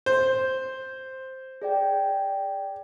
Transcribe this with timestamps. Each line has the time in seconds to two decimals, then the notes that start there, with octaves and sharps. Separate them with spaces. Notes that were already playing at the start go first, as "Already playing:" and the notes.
0.06 C5
1.62 G#4 D5 G5